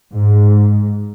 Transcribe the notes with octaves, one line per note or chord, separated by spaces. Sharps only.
G#2